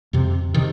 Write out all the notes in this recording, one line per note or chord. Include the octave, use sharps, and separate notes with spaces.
F2 C3
C3 D#3